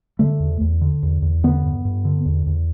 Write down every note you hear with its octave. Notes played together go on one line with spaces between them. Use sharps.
D3 A3
E2
E2
D3
E2
E2
D3 B3
G2
G2
D3
E2
E2